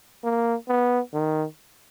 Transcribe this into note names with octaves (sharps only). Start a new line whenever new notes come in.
A#3
B3
D#3